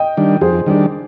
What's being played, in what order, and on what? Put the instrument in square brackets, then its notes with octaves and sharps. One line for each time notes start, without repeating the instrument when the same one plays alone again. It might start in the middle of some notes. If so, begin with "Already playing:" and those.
Already playing: [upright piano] D#5 G5
[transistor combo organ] D#3 G3 D4
[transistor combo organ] F2 [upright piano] G#4 C5
[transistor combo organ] D#3 G3 D4